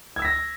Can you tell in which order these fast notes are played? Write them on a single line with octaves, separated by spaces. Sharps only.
G#6 E6 B6 A#6